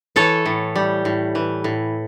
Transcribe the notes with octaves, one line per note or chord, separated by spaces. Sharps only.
E3 A4 C#5
A2
G3
A2
E3
A2